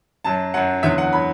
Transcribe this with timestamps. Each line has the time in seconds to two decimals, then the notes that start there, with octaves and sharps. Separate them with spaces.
0.24 F#2 F#3 A5
0.54 F#2 F#3 F#5
0.83 E2 D3 F#3 E5
0.98 F#5
1.13 D3 F#3 B5